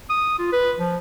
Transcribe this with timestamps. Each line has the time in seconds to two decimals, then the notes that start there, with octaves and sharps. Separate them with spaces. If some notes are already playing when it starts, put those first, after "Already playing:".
0.10 D#6
0.38 F4
0.53 B4
0.79 F3